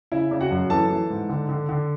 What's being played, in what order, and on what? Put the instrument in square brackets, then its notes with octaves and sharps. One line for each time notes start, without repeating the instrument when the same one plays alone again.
[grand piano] C#3 E4 E5
C#3
F#4 F#5
F#2
E3 A4 A5
E3
G#2
D3
D3
D3